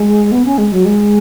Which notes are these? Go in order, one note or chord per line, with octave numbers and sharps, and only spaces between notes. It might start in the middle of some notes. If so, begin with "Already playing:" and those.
Already playing: G#3
B3
C#4
G#3
F#3
G#3